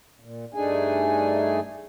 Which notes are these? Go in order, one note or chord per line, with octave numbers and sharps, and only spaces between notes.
A#2
G2 A3 D4 D#4 G#4 G#5